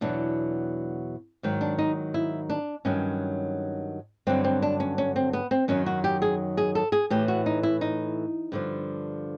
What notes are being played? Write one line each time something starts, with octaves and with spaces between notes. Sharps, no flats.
E2 B2 F#3 D4
G#2 D#3 F#3
D4
D#4
E4
D4
G2 D#3 F#3 C#4
G2 D3 F#3 C4
C4
D4
C#4
C#4
C4
B3
C4
F#2 D#3 F#3 C#4
F#4
G4
G#4
G#4
A4
G#4
A2 E3 G4
F#4
D#4
E4
D#4
G2 D3 F3